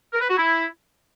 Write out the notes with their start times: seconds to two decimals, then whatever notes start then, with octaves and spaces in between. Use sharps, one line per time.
0.13 A#4
0.21 B4
0.29 F#4
0.37 E4